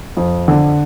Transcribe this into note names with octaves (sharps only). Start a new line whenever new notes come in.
F2
D3